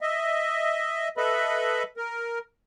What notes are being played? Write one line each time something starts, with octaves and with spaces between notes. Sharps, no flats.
D#5 E5
A4 B4 D#5 E5 B5
A#4